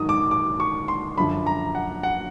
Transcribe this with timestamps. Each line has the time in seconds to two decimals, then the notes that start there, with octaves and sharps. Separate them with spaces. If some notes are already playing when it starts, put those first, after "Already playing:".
Already playing: G#2 D#3 F#3 D#6
0.09 D6
0.31 D6
0.60 C#6
0.88 C6
1.18 F#2 D3 F3 B5
1.46 A#5
1.75 F#5
2.03 F#5